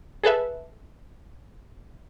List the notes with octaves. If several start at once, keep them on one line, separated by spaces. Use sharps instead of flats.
G#4 A4 B4 E5